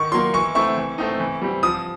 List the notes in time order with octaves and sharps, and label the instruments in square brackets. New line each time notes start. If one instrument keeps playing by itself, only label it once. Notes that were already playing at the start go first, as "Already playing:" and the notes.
Already playing: [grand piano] D#3 C#6
F#3 A#3 C6
E3 C#6
A3 C4 E4 C#6
E3
A3 C4 D#4
E3
G3 C4
F3 D#6